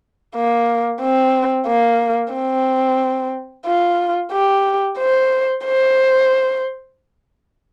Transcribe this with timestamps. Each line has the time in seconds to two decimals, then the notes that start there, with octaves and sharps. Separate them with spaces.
0.35 A#3
1.01 C4
1.67 A#3
2.33 C4
3.66 F4
4.32 G4
4.99 C5
5.65 C5